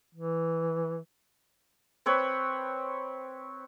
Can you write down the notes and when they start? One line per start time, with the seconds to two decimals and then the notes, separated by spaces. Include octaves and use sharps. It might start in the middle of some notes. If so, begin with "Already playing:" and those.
0.15 E3
2.06 C4 B4 C#5